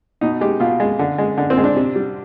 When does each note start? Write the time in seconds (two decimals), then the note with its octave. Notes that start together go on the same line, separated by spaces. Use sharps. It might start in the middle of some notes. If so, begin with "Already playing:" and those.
0.21 B2 D#4
0.41 G#3 G4
0.60 B2 F4
0.80 G#3
0.99 D3
1.18 G#3
1.37 D3
1.50 C4
1.57 G#3
1.64 D4
1.76 C3
1.96 G3